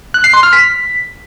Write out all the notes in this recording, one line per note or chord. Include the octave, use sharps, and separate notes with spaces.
F#6
C7
C6
F6
B6